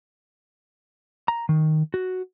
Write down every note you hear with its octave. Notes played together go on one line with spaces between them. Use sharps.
A#5
D#3
F#4